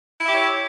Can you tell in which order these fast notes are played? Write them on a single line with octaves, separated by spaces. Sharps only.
E4 E5 G4 C#5